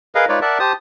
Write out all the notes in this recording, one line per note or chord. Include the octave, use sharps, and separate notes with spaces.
G#4 A#4 B4 D#5 F5
G#3 D#4 F4 B4 C#5 D5
A#4 D5 E5 F#5 A5
G4 C5 A5 D#6